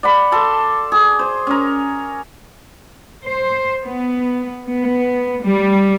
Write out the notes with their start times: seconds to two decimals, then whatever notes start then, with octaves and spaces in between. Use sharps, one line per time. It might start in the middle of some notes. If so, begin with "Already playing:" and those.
0.03 D5 F#5 B5
0.32 A4 A5 C6
0.92 G#4
1.19 C5
1.47 C#4 A#4
3.26 C5
3.86 B3
4.68 B3
5.43 G3